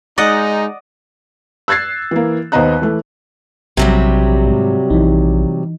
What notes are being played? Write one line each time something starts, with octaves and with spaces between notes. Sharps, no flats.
G#3 D#4 D5 D#5 F#5
E6 F#6 G#6 A6 C7
E3 A#3
D#2 B3 C5 D#5 A#5 F#6
E3 A3
A#1 C3 F#3 G3
G#2
A#1 E3 D#4